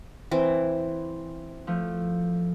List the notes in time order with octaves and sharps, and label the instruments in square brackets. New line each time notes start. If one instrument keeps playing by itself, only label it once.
[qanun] E3 C4
[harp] F3 A3